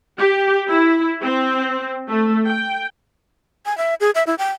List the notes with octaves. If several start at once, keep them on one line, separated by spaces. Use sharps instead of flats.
G4
E4
C4
A3
G5
G#5
E5
G#4
E5
E4
G5